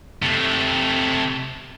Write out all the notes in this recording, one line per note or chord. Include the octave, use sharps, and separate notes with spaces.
C3 A3